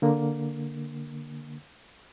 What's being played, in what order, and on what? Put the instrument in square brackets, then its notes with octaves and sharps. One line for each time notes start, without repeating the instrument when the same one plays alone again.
[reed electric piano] D3 A#3